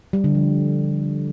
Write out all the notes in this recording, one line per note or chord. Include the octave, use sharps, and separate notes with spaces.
G3
D3
F3